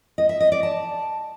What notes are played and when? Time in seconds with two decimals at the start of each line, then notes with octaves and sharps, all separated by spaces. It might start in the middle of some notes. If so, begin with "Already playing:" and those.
0.18 D#5
0.29 E5
0.40 D#5
0.52 D5
0.63 A5